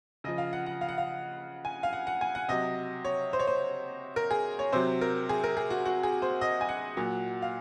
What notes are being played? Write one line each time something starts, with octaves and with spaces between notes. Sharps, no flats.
C#3 F3 D#5
F5
F#5
F#5
F5
F#5
F5
G#5
F5
F#5
F#5
G#5
F#5
C3 F#3 D#5
C#5
C5
C#5
C5
A#4
G#4
C#5
C3 F#3 C5
A#4
G#4
A#4
G#4
F#4
F#4
G#4
C5
D#5
G#5
F#5
A#2 F#3
F5